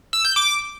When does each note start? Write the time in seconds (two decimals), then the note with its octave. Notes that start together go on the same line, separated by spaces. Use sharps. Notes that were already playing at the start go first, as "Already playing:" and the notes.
0.13 E6
0.25 G6
0.36 D6